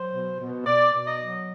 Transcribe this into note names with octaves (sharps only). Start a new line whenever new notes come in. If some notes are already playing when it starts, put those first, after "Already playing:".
Already playing: F#3 C5
B2
B2
B2 D5
B2
D#5
F#3